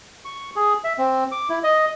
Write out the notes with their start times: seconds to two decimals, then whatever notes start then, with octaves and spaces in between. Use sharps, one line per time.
0.25 C#6
0.56 G#4
0.84 E5
0.98 C4
1.32 D6
1.49 E4
1.64 D#5